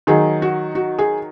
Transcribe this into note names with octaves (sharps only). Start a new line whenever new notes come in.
D#3 F#3 D#4 G#4
F#4
F#4
G#4